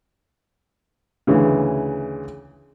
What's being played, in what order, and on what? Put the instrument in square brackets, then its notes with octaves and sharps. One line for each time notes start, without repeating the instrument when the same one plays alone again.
[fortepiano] D2 C#3 E3